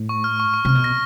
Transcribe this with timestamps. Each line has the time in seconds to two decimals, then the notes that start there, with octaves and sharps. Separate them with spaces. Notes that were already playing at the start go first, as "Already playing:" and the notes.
Already playing: A2
0.09 C#6
0.24 F6
0.40 C#6
0.54 C#6
0.65 C3 F6
0.75 B2
0.84 A#6